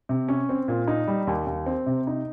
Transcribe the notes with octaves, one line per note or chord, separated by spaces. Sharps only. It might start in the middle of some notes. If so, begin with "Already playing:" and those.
C3
C#4
C4
A#2
D#4
G3
D#2
D#2
C4
C3
D#4